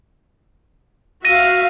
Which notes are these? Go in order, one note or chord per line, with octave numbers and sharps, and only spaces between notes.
F#4 E5 F5 A#6 D#7